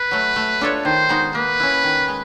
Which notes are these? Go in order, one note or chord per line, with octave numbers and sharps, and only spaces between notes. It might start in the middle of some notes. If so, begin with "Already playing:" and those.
Already playing: B4
F#3 A3
A3
D4 F4 A4 C#5
D#3 C5
G#3 B3 D#4 F#4
A#3 B4
C#4 E4
D#3
G#3